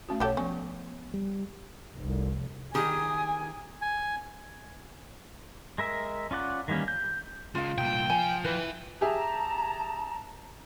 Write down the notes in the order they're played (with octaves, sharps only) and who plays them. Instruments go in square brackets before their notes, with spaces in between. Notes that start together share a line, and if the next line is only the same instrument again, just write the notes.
[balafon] A3 C#4 F#4
[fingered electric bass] B1 [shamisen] F#3 G4 A4 [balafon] C#5 F#5
[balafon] F3 C#6 [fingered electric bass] B3 [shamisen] C#4
[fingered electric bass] G3
[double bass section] F1 [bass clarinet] C2
[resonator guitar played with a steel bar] D#3 G4 G#4 [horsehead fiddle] G#5 [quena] D#6
[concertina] G#5
[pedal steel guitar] G#3 A#4 E5
C#4 F4 D5 F#5
D#3 E3 G3 A#3 C#4
G6
[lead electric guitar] C#3 G#3 [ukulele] F4 F5
[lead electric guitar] C2 A#2 [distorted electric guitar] G5
[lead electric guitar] F3 [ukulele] G#5
[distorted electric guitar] E3 [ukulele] B4
[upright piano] G4 G#4 E5 [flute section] A5 A#5